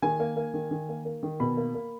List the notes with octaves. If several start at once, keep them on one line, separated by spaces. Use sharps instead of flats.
D#3 G#5
A#3
A#3
D#3
D#3
A#3
A#3
D#3
B2 B5
A#3
A#3